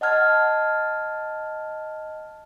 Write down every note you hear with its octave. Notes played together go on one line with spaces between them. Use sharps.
D#5 F#5 A5 F6 G#6 A6